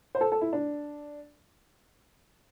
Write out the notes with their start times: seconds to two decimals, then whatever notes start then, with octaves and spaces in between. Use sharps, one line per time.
0.15 C5
0.21 A4
0.32 A4
0.41 E4
0.53 D4